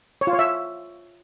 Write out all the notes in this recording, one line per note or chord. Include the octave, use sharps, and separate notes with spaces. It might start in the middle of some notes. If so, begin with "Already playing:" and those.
C#5
F4
C#5
E5